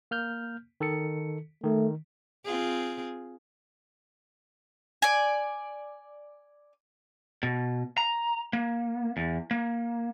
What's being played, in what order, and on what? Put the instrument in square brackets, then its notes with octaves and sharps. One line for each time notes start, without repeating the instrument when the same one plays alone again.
[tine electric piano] A#3 F6 G6
D#3 A4 C#7
[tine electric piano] D#3 [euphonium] A3
[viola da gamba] C4 F4 G#4
[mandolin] D5 G#5
[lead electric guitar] B2
A#5
A#3
E2
A#3